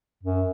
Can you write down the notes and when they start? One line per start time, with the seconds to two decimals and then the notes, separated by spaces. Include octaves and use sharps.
0.23 F#2